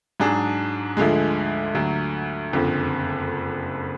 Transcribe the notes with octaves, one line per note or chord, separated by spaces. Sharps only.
G#2 F#3 D4 G#4
D2 D3 F3 G#3
D2 D3 F#3
F#1 F2 D3